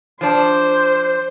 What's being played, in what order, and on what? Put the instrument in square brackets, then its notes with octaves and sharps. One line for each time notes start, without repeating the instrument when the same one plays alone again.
[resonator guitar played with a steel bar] F3 D4 [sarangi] C5